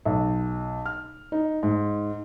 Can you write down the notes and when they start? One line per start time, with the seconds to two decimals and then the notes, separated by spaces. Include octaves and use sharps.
0.06 B1
0.86 F6
1.32 D#4
1.63 G#2